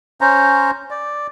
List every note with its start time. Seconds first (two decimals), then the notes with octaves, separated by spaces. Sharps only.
0.21 C#4 C5 A#5
0.91 D5